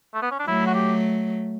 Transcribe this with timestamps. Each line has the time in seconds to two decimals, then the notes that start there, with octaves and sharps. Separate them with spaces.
0.14 A3
0.22 B3
0.31 C#4
0.39 D4
0.47 F#3 A3 E4
0.67 F#4
0.74 G4